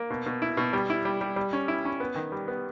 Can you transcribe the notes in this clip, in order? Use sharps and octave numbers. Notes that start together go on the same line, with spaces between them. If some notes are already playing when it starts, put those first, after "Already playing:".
Already playing: A#3
B2
B2
E4
B2
G3
E4
G3
G3
G3
C#4
E4
C#4
B3
D#3
G3
B3